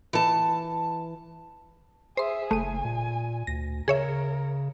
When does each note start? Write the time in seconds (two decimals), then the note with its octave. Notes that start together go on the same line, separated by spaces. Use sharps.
0.13 E3 A5
2.17 G#4 C5 E5 C6
2.51 F#1 A3 G#5 D#7
2.84 A#2
3.47 D2 A#6
3.88 C#3 G#4 A#4 C#5 E5